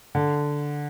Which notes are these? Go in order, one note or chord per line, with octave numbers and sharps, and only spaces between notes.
D3